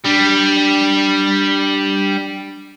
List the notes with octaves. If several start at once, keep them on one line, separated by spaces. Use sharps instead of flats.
G3 D4